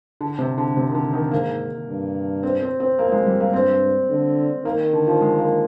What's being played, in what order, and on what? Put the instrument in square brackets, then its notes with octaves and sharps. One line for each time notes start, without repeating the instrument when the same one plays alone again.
[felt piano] D3
C3
D3
C3
D#3
D3
D#3
[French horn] G#2 [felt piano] A#3
[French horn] G2
[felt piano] C4
C4
C4
[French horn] F2 [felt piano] A#3
[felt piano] A#3
G#3
G3
A#3
[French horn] G2 [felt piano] C4
[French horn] D3
[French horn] D#3 [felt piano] A#3
[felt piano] D3
F3
G#3
A#3